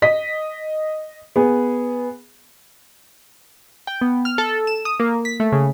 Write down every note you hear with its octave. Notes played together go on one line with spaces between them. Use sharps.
D#5 B6
B3 G#4
G5
B3
F6
A4
E7
D#6
A#3
B6
A3
C#3